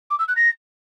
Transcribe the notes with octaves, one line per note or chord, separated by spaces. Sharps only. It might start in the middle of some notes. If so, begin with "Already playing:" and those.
D6
E6
F#6
A#6